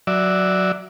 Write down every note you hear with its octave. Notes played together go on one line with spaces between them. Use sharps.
F#3 D5 E5